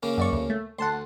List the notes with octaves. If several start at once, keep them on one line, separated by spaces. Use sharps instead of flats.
C#3 A#3 C#4
F#2 D5 C#6
D2
A3
D2 F#5 A5 C6